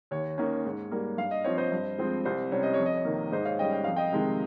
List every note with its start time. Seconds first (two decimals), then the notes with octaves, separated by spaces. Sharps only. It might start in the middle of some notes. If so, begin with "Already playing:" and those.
0.11 D#2 C#5
0.38 D#3 A#3 C#4
0.66 G#2
0.92 G3 A#3
1.18 G2 F5
1.31 D#5
1.44 F3 C4 C#5
1.58 C5 D#5
1.72 G2
1.98 F3 G#3 C4
2.25 C2 C5
2.52 C3 G3 C#4 C#5
2.63 D#5
2.74 F2 C#5
2.86 D#5
2.97 C#5
3.05 C3 D#3 A#3
3.32 G#2 C5 D#5
3.45 C#5 F5
3.59 G3 C#4 D#5 G5
3.73 G5
3.84 F2 F5
3.96 D#5 G5
4.12 C3 D#3 G#3